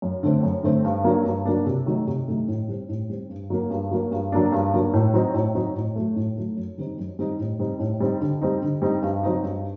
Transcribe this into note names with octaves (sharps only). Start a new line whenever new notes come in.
F#2
D3 A3 C4
F#2
D3 A3 C4
G2
F#3 A#3 D4
G2
F#3 A#3 D4
C3
D#3 F#3 A3 D#4
C3
D#3 F#3 A3 D#4
A2
G3 C4
A2
G3 C4
G2
F#3 A#3
G2
F#3 A#3
G2
F#3 A#3 D4
G2
F#3 A#3 D4
A2
F#3 C4 D#4
A2
F#3 C4 D#4
A2
F#3 A3
A2
F#3 A3
F#2
D#3 G3 C4 D#4
F#2
D#3 G3 C4 D#4
A2
G3 C4 D#4
A2
G3 C4 D#4
D3
G3 C4 D#4
D3
G3 C4 D#4
G2
F#3 C4 D#4
G2